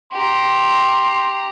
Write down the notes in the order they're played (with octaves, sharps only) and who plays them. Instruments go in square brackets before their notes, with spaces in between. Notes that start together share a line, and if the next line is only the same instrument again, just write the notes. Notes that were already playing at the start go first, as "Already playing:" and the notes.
[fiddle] G4 A#5 [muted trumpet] C6